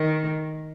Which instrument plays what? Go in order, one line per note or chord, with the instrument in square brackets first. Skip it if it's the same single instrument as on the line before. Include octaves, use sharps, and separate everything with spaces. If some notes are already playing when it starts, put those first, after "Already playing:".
Already playing: [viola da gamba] D#3